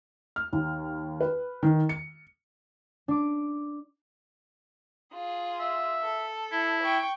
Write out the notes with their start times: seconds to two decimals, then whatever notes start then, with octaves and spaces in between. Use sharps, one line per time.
0.36 F6
0.53 D#2
1.21 B4
1.63 D#3
1.89 C#7
3.08 D4 D6
5.13 F4 G#4
5.60 E5
6.02 A4
6.52 E4
6.83 G5 C#6